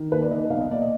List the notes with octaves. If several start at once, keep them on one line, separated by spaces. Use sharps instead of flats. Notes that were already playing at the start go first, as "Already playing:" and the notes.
Already playing: D#3
D#2 B4
D5
D#3 D#5
B1 F5
D#5
A#2 D5
D#5